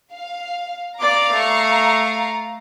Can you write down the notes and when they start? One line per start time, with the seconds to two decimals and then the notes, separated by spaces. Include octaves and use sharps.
0.12 F5
0.99 D5 F5 A#5 D6
1.32 A3 C#6